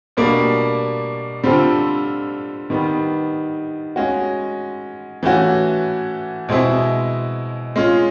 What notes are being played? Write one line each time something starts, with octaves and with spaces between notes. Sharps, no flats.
B2 G3 A#3 D4
D3 G3 C4 F4 A4
D#3 G3 B3
G#3 C#4 F#4
E3 A3 C#4 F#4
B2 G#3 C4 E4
G#3 C#4 F4